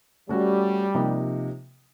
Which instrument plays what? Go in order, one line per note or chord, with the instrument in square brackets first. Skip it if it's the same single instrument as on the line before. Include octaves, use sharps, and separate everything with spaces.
[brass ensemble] G3 [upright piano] A3 C#4 F#4
[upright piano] C3 F3 A#3 D#4